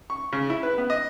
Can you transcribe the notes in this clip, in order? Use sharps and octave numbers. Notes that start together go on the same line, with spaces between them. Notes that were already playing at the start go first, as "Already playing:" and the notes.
C#6
C#3
E4
B4
B3
D#5